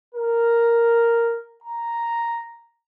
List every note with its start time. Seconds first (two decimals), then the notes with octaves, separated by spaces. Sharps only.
0.15 A#4
1.64 A#5